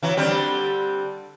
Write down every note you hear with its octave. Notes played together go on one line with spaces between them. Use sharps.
E3 F#3
D3 G3 C4